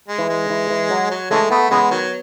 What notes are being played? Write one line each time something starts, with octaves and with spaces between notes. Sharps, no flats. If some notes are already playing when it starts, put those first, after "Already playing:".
G#3
E3
G#3
E3
E3
F#3
F#3
C#3 E3 G#3 A3
A3 B3
C#3 E3 G#3 B3
D#3 F#3